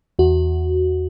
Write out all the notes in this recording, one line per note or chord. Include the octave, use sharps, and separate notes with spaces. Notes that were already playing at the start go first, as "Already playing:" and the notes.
E2 F#4